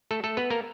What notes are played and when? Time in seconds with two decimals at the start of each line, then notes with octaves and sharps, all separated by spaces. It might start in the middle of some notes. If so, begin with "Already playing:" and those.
0.11 A3 A4
0.24 A3 A4
0.37 B3 B4
0.50 A#3 A#4